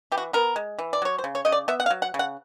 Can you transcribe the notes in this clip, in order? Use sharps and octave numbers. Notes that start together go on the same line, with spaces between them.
E3 G4
F#4
B3 A#4
G#3
E3
D5
F#3 C#5
C5
C#3
C#5
C#3 D#5
D5
B3 E5
F#5
F5
F#3
F#5
C#3
F#5